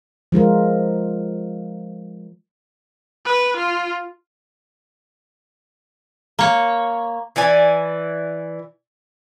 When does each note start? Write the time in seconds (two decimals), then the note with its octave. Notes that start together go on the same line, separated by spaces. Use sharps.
0.32 F3 G#3 F4 A#4
3.25 B4
3.57 F4
6.39 A#3 C#5
7.36 E3 E4 D5 G#5